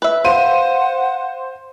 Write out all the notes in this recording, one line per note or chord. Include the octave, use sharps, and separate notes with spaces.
B4 E5
C5 F5 F#5 C6 D#7